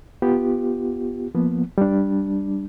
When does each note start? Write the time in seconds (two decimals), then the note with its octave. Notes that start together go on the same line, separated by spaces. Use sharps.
0.22 B3 F4 G4
1.35 F3 A#3 B3
1.78 G3 D4